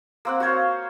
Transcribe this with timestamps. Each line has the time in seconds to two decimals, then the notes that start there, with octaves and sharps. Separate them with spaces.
0.25 A#3 C4 F#5
0.40 F#4 C5 C#5 F5